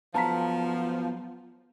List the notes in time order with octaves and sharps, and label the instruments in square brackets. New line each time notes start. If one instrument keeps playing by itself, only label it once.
[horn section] F3 [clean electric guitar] F#3 B3 F4 [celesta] A5 A#5 B6